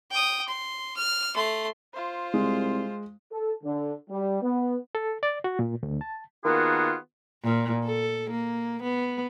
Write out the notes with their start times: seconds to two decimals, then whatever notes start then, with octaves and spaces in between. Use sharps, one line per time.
0.11 G5 D#6
0.48 C6
0.97 F6
1.35 A3 C6
1.94 F4 C5
2.34 C2 G#3
3.32 A4
3.64 D3
4.10 G3
4.42 B3
4.95 A4
5.23 D5
5.44 F#4
5.59 A#2
5.83 D2
6.01 A5
6.44 D#3 A#3 B3 F4 F#4 G#4
7.44 A#2
7.85 A4
8.30 A#3
8.83 B3